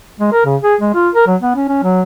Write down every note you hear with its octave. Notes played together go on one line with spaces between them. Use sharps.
G#3
A#4
C#3
G#4
G#3
F4
A#4
F#3
B3
C#4
C#4
F#3